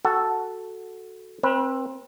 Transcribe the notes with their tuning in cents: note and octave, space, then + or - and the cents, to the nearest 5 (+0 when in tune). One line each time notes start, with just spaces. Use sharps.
F#4 +0 A4 +0 F#5 +20
C4 +20 B4 -30